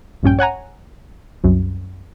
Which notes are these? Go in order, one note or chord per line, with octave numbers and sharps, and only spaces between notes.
A#1 G2 C#4 G5
C#5 F#5 G#5 A#5
C2 F#2